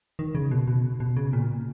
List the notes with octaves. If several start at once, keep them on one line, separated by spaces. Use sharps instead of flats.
D#3
C#3
B2
B2
B2
C#3
A#2